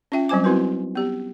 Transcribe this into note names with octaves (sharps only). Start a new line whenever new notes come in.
C#4 F4 E5 G5
F#3 G3 C4 C5 G#5 D6
B3 C4 E4 F#4 A#4 B4
B3 G4